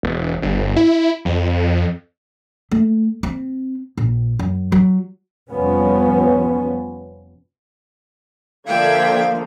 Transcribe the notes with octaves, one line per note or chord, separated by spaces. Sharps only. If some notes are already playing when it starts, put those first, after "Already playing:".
E1
G1
E4
F2
A3
C4
A#1
F#2
F#3
F1 F3 G3 B3 C#4
D3 F3 A#3 D5 E5 F5 G5 G#6